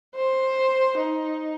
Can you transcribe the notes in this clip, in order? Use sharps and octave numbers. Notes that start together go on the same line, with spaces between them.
C5
D#4